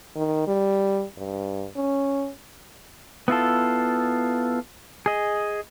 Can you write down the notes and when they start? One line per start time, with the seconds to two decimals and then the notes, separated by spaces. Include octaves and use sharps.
0.16 D#3
0.47 G3
1.17 G2
1.76 C#4
3.28 B3 E4 F4 A4
5.06 G#4 D#5